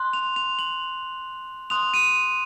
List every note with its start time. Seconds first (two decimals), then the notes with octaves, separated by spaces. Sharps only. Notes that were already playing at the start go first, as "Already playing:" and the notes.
Already playing: C6 F#6
0.13 F7
0.36 F7
0.59 F#7
1.70 C6 D#6 F#6 F7
1.94 D#7